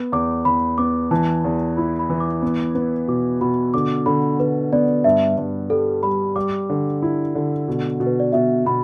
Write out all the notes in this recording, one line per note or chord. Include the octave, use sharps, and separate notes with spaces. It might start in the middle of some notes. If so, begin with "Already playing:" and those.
Already playing: B3
E2 D6
E2 B5
B3 D6
E3 A5
E2
E4 B5
B5
E3
D6
B3
B3
B2 D6
B2 B5
D3 D6
D3 B5
D3 B4
B3 D5
G2 E5
G2
G3 A4
G3 B5
G3 D6
D3
E4
D3
B2
B2
B4
D5
B2 E5
B2 B5